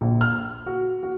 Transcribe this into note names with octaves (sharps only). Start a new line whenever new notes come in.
A#1
F6
F#4
F#4